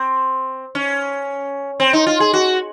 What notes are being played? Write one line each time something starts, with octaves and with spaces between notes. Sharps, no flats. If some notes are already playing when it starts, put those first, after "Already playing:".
Already playing: C4
C#4
C4
D#4
F4
G#4
F#4